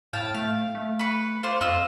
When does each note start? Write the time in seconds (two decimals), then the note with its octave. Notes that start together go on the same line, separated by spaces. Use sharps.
0.13 A2 F5 G5 A5
0.34 A3 F5
0.75 A3
0.99 B4 C#6
1.43 F4 C5 D5
1.61 F2 F4 D#5 E6